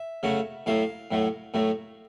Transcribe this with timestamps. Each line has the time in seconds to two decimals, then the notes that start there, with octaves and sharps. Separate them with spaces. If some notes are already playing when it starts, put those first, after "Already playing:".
Already playing: E5
0.23 C#3 F#3 A3 C#4
0.66 A2 F#3 A3 F5
1.11 A2 F#3 A3
1.54 A2 F#3 A3